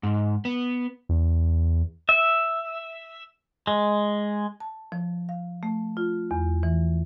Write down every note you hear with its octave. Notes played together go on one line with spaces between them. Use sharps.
G#2
B3
E2
E5
G#3
A5
F3
F5
A3
F4
E2
E3